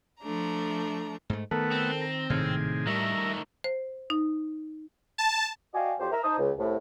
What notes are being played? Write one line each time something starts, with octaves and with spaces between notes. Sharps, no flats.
F3 A3 D4 A#5
G#2 A3
D#3 A3 B3 A4 A#4 F#5 A5
C4
A#5
G#1 A2 C3 D#3 G#4 F6
D#3 G3 A3 A#4 E5 A#5
C5
D#4
A5
F#4 D5 D#5 F5 G5 G#5
F2 F3 F#3 G4 C5
A#4 E5 A#5
D#4 C5 A5 D#6
C#2
C2 A2